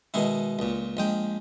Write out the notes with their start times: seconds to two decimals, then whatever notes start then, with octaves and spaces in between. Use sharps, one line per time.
0.14 B2 D#3 G#3 E4
0.59 C#2 A#2
0.97 A#1 G#3 G5